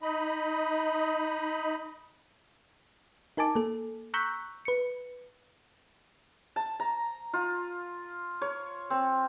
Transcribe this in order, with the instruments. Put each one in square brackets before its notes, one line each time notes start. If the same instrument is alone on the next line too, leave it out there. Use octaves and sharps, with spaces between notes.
[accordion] D#4 D#5 B5
[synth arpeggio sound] D#4 A#4 G#5 A5 D6
A#3 A4
A#5 C#6 E6 F#6 G6 B6
B4 C#7
[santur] A5
A#5
F4
C#5
C4